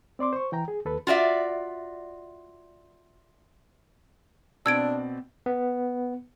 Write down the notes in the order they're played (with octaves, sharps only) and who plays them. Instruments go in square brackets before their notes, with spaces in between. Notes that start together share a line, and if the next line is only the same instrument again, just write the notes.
[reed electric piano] C4 D5 C6 D6
C5 C#6
E3 G5 A#5
G#4
D#2 A4 B4
[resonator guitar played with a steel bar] F4 F#4 D5 E5
[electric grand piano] B2 C4 D5 [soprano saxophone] D4 [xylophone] E6 G#6 D7
[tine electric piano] B3